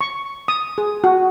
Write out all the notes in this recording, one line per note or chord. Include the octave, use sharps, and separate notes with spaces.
C#6
D#6
G#4
F#4